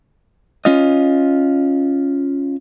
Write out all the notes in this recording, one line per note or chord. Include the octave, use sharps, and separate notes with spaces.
C#4 F4 D#5